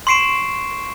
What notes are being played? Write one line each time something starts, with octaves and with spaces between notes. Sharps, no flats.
C6 C#6 C7 D7 E7